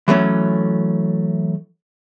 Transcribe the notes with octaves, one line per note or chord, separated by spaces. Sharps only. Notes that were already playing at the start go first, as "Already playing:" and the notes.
E3 F#3 A3 C#4